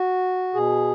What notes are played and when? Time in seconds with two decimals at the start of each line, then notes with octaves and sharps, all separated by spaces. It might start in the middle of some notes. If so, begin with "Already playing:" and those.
Already playing: F#4
0.54 B2 G#4